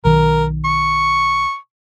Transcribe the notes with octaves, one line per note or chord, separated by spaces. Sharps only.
B1 D#3 A#4
C#6